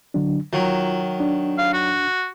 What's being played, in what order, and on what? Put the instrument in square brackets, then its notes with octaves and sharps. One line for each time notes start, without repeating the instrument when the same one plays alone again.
[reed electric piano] D3 F#3 D4
[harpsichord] D#3 F#3 [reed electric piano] F4
[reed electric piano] D4
[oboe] F5
F#4